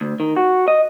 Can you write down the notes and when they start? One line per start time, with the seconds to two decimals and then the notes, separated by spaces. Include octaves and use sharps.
0.01 D2
0.20 D#3
0.36 F#4
0.68 D#5